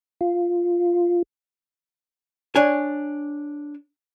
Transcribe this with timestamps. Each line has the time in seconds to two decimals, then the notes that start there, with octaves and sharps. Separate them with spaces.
0.21 F4
2.56 D4 C#5 G#5